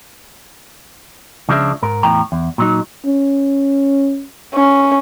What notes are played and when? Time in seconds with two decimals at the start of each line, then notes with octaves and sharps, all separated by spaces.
1.49 C#2 C#3 F3 G#3 D4 E5
1.83 G#2 A#4
2.03 E2 A2 G5 A#5
2.32 E2
2.58 A#2 F#3 D#4
3.06 C#4
4.54 C#4